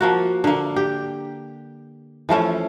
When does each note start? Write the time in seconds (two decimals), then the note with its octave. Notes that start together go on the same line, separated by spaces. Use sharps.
0.01 F3 A#3 F#4
0.44 D3 A#3
0.76 G4
2.29 E3 F3 A3 C#4